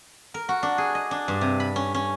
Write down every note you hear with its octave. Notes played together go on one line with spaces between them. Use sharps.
A#4
F#4
D4
G#4
D#5
D4
G2
C3
B5
C#4
C#4